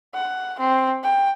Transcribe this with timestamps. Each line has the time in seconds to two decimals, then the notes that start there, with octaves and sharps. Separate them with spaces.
0.14 F#5
0.59 C4
1.03 G5